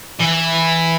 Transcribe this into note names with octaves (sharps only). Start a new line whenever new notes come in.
E3